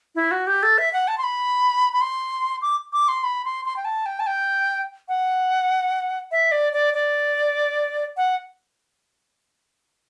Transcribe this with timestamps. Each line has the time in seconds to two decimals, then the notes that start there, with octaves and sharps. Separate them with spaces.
0.15 E4
0.31 F#4
0.47 G4
0.63 A4
0.78 E5
0.93 F#5
1.08 A5
1.18 C6
1.24 B5
1.93 B5
2.01 C6
2.62 D6
2.93 D6
3.08 C6
3.24 B5
3.45 C6
3.65 C6
3.77 G5
3.85 A5
4.06 G5
4.20 A5
4.27 G5
5.08 F#5
6.32 E5
6.52 D5
6.73 D5
6.94 D5
8.17 F#5